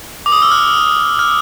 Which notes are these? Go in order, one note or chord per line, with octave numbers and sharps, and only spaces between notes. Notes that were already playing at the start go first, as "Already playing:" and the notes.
D6
D#6
E6
F6
F6